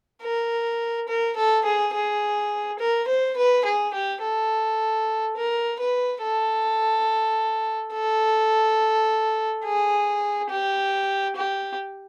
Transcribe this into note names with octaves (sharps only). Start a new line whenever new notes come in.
A#4
A#4
A4
G#4
G#4
A#4
C5
B4
G#4
G4
A4
A#4
B4
A4
A4
G#4
G4
G4